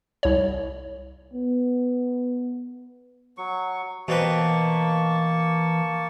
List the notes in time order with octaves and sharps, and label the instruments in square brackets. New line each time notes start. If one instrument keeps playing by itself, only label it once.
[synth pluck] C2 C#5
[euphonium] B3
[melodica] F#3 C#6
[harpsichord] B2 C4 B4 [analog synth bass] E3 [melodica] A#3 A5 C#6